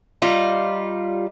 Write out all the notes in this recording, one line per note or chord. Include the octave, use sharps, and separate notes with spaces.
G3 D#4 F4